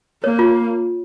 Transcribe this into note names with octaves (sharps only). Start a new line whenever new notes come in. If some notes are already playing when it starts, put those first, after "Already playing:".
A#3 C#5
F4